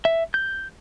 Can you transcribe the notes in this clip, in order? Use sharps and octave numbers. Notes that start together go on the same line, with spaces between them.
E5
G6